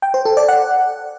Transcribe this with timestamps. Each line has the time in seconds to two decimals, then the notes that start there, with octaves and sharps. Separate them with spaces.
0.02 G5
0.14 C5
0.25 A4
0.37 D5
0.48 F#5